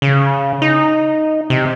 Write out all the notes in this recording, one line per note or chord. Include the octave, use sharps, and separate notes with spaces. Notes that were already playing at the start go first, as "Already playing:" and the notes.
C#3
D#4
C3